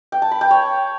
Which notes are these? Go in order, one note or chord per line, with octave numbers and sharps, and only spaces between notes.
G5
A5
B5
G5
C#5